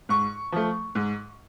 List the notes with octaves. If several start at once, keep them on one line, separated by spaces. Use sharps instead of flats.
G#2 C#6
F3 A3
G#2